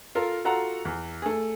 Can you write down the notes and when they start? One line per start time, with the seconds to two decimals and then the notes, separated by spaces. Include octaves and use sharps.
0.15 F4 A4 A#4
0.45 F4 F#4 A4 F#5 A#5
0.85 E2
1.22 A3 G#4